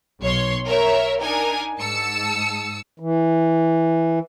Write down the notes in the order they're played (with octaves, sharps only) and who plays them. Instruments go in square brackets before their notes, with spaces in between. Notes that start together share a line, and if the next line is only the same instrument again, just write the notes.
[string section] B1 C#5 C6
A#4 C#5 E5
D4 D#4 A#4 G#5
G#2 A5 E6 C#7
[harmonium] E3